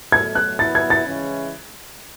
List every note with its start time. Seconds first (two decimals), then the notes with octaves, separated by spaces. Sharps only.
0.12 B2 F#3 A3 G#6
0.35 F#6
0.59 F#3 B3 E4 A6
0.75 G#6
0.90 A6
1.06 C#3 E3 G#3 C#4 E4